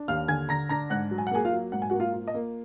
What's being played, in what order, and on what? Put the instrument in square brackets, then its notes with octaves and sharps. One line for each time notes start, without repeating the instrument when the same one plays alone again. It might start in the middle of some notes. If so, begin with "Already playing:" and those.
Already playing: [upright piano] D4
D#2 F5 F6
D3 G#5 G#6
D3 A#5 A#6
D4 A#5 A#6
G#2 F#5 F#6
F#3
G#5
F#5
A#3 G#4 G#5
F4 F5
F#3
G#2 F#5
G#5
F#4 F#5
A#3
F4 F5
F4
D#5
A#3